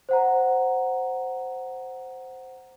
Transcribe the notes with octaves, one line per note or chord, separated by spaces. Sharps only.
C5 F#5 A#5